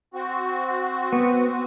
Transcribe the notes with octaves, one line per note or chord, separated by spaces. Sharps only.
C4 F#4
B3